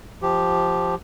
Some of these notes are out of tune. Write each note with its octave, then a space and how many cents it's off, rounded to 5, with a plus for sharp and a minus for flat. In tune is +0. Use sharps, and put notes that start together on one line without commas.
F3 +0 G4 +0